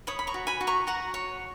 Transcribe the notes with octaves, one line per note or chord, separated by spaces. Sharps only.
C#5 B5 D#6
B5
A#5 C#6
F#4
G#5 B5
F#4
A#5 C#6
F#4 F#5 A#5
C#5